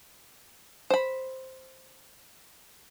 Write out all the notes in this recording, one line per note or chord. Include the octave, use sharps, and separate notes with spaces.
C5 B5